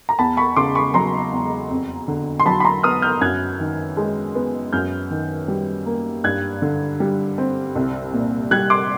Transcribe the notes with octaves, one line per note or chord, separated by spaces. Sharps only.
A#5
E2 A5 B5
B5 C#6
C#3 C6 D6
B5 C#6
F#3 A#5 C6
E2
F2
D3
C6
F#3 A5 B5
B5
A#5 C6
B3 D#6 F6
F6 G6
F#2 F#6 G#6
D#3
G#3
B3
F#2 F6 G6
D#3
G3
A#3
G2 F#6 G#6
D3
G3
C4
C2
A#2
G3 F#6 G#6
C6 D6